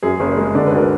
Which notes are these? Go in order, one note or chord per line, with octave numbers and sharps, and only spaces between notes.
F#2 G#4
F#1 G#4
G#3 A#4
D3 D5
B4
D2
A#4